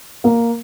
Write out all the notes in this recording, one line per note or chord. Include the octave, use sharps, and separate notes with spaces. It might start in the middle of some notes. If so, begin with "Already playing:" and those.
A#3